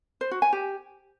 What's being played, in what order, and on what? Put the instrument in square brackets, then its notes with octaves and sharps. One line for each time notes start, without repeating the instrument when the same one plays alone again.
[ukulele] C5
F#4
G#5
G4